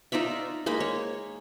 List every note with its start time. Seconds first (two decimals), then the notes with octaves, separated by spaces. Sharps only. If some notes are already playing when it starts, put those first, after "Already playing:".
0.12 D#4 F4 D5 E5
0.66 G#3 A#3 B5
0.80 C#5